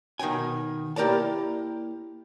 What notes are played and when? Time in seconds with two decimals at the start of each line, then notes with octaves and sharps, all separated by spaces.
0.19 B2 D#3 D#4 G5 G#5
0.96 A#3 E4 G4 A#4 D5 A5